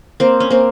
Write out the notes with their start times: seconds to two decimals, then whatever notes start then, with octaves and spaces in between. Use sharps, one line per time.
0.20 A#3 C4
0.40 C#4
0.50 A#3 C4